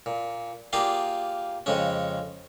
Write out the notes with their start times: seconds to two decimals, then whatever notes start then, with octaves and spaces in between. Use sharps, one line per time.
0.06 A#2
0.73 A#3 F4 G4 G#4 D5 F5
1.66 F2 C#3 G#3 C#4